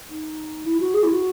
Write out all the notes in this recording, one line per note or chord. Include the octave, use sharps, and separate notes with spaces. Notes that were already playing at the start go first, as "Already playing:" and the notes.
D#4
E4
F#4
G#4
E4
F#4